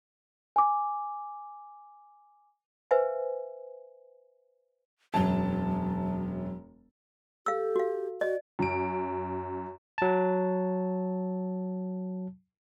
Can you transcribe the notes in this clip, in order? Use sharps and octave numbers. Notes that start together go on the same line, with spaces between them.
G#5 D6
B4 C5 E5 F5 G#5
E1 F#2 F#3 A5
G4 A4 F5 E6
F#4 F5
F#4 D5 D#5
F#2 D7
F#3 A5